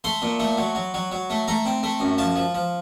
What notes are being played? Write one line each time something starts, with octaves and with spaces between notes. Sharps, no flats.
A3 C6
A#2
A3
F#3
F#3
F#3
F#3
A3
A3 A#5
C4
A3
F#2
F3 A5
F3
F3